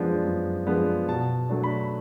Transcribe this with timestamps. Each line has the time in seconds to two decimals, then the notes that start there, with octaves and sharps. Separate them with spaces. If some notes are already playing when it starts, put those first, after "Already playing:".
Already playing: F#2 F3 G#3 B3 D4
0.25 F#2
0.66 F3 G#3 B3 D4
1.08 B2 A5
1.49 F#3 A3 D4
1.64 B5